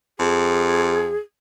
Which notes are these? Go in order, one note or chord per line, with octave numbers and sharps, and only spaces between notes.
F2 G#4